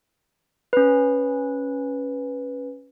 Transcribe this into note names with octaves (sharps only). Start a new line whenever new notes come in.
C#4 B4